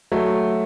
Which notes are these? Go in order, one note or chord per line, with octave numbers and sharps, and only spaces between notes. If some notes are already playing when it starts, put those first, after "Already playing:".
F#3 A3